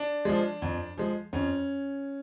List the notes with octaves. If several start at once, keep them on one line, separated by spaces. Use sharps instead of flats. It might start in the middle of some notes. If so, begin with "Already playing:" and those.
Already playing: D4
F3 G#3
F2
F3 G#3
F2 C#4